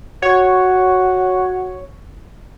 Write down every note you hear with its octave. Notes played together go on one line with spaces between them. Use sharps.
F#4 C#5